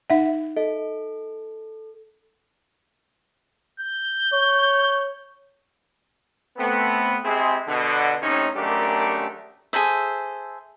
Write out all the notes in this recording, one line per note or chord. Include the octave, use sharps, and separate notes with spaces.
D#4 E5 F#5
A4 D#5
G6
C#5
A3 B3 C4
G#3 C4 E4 G4 G#4
B2 D3
A2 C3 C#4 D#4
G#1 F#2 A3 D4 G4 A#4
G#4 A4 C5 E5